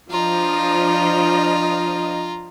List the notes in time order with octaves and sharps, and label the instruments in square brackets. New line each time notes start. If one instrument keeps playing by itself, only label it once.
[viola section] F3 D4 D#5 [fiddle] F4 A#5